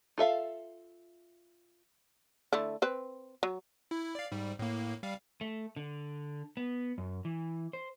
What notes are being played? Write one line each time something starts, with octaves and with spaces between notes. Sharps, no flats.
F4 A4 E5 F5
D3 A3 E4
C4 B4
F#3
E4
D5 F5
G#2 G3
A2 A#3
G3 F5
A3
D3
B3
F#2
E3
C5